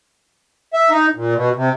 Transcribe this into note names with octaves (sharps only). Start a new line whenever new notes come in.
E5
D#4
A#2
B2
C3